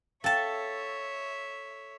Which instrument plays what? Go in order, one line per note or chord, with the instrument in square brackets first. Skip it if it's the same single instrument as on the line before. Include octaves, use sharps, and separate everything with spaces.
[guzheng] A4 A5 [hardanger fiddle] C#5 E5 [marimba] F5 G5